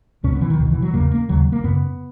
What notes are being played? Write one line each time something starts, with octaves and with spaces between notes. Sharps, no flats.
C#2 B2 C#4
B3
E3
D#3
C#2 B2
E3
F#3
E2 C#3 A#3
A#3
D#2 C#3 F#3
A#3
F#2 C#3 B3